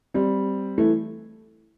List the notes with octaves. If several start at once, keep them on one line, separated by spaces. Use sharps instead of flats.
G3 C4
E3 A3